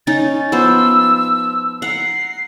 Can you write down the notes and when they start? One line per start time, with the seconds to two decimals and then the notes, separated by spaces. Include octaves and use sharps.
0.07 C#4 D#4 A6
0.52 F3 B3 C5 E6
1.82 F#5 A#5 C7